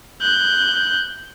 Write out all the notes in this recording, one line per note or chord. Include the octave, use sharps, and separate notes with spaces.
F#6 G6